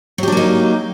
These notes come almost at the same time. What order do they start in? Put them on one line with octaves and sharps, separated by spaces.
F#3 G4 D4 A#3 D#4